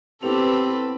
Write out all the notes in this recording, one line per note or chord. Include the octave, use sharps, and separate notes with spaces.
A2 B3 C4 G4 A4 B4 F7